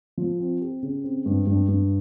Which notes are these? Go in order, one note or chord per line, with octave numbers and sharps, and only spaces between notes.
F3
C4
G4
C#3
C4
G2
G2
G2